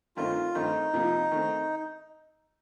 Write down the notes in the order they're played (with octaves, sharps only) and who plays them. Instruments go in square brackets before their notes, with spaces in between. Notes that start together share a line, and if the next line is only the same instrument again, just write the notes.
[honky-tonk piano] G2 D#3 A3 C4 D#4 [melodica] F4
[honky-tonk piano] G2 D#3 A3 C4 [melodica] D#4
[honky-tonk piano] F2 C3 F3 A#3
D#3 A3 C4